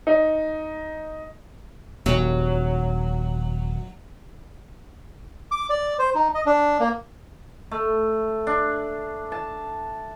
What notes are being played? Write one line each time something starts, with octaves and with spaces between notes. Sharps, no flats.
D#4
D#1 F#3
D6
D5
C5
D#4
D#5
D4
A#3
A3
D4
A5